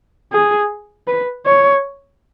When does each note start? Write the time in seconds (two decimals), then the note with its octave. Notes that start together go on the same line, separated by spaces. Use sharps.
0.32 G#4
1.07 B4
1.46 C#5